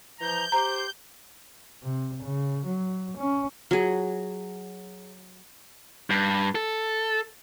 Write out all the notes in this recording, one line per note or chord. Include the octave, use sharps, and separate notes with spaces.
E3 F3 A#5 G6
G4 C5 A#5
C3
C#3
F#3
C#4
F#3 G#4
G2
A4